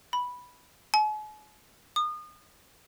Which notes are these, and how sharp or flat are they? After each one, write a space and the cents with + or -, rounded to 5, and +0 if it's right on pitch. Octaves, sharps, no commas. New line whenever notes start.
B5 -5
G#5 +45
D#6 -35